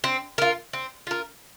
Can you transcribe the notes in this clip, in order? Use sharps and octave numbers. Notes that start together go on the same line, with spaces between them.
C4
F4 A#4
C4
F4 A#4